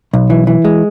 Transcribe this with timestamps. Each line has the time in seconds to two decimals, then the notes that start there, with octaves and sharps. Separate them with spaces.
0.13 B1
0.30 E3
0.47 E3
0.65 G#3